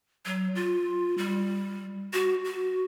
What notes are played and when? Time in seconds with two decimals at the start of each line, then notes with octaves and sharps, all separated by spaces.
0.25 F#3
0.55 F4
1.18 G3
2.13 F#4
2.45 F#4